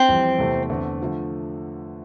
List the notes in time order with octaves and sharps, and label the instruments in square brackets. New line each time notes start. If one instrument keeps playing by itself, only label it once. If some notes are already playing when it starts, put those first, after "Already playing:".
Already playing: [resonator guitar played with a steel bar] C4
[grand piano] F2 E3 G3
E2 C3 E3 A3
E2 D3 A3 C4
D3 F3 A3